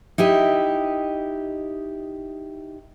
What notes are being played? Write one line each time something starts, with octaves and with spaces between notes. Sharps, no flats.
D#4 E4 G4 D#5